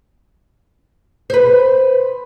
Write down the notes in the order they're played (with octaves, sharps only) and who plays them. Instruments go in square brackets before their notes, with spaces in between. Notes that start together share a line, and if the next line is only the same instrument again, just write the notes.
[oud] B4 C5